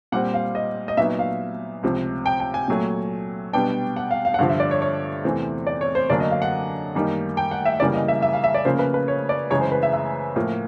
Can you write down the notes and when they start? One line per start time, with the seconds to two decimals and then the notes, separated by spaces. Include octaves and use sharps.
0.12 A#2 G3 C4 F#5
0.34 F5
0.55 D#5
0.88 D#5
0.97 A#2 F#3 B3 D#4 E5
1.19 F5
1.83 C#2 C3 F3
2.26 G5
2.40 G5
2.54 G#5
2.68 A#2 F#3 A3
3.53 B2 G3 B3 D4 G5
3.96 F#5
4.11 F5
4.25 F5
4.34 F#5
4.39 G2 D3 F3 F5
4.49 E5
4.60 D5
4.71 C#5
4.82 C#5
5.24 E2 C3 E3 A3 C4
5.67 D5
5.81 C#5
5.95 C5
6.09 F#2 D3 F#3 A#3 D4 D5
6.20 D#5
6.31 F5
6.42 F#5
6.95 F#2 D#3 G3 A#3 D#4
7.37 G5
7.51 F#5
7.65 E5
7.80 F#2 C#3 E3 G3 A#3 D5
7.94 D#5
8.08 E5
8.22 E5
8.33 F5
8.44 E5
8.54 D5
8.65 C#3 F3 A#3 C#4 C5
8.79 B4
8.94 B4
9.08 C#5
9.29 D5
9.50 F#2 C#3 E3 G#3 C#5
9.61 C5
9.72 B4
9.83 E5
9.93 E5
10.36 A2 F3 A#3